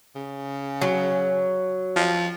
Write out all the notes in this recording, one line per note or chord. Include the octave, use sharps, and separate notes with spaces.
C#3
F#3
F3